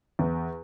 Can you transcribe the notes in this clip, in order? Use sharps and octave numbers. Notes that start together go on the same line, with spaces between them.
E2